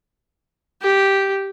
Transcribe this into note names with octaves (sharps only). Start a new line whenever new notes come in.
G4